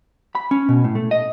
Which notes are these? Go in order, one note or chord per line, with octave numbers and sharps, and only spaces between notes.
B5
C#4
B2
A2
A3
D#5